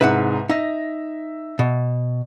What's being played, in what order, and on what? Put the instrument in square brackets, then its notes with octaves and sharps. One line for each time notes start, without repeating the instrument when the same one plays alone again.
[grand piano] C2 G#2 [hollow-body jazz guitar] B4 E5 F#5
[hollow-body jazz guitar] D#4 [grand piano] E5 A#6
[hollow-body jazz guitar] B2